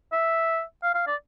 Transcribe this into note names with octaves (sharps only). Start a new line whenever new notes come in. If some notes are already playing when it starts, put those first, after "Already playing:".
E5
F5
F5
D5